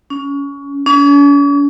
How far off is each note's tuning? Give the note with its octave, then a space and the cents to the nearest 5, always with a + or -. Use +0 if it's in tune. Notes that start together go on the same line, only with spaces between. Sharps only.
C#4 +20
C#4 +45